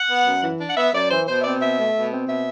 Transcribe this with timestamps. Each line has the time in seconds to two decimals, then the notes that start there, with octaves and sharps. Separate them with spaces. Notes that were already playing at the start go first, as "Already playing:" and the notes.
Already playing: F#5
0.10 B3
0.26 F#2
0.43 E3
0.60 D4
0.70 F#5
0.77 B3 E5
0.94 F#2 D5
1.10 E3 C5
1.27 B2 C5
1.40 E5
1.44 C4 D5
1.60 B2 E5
1.77 A3
1.94 B2
2.11 C4
2.28 B2 E5